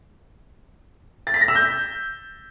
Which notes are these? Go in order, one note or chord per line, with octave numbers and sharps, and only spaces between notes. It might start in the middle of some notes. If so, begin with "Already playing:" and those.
A6
B6
A#6
E6
G6